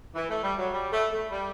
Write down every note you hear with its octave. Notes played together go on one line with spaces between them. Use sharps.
E3
A3
G3
F#3
G3
A3
A3
G3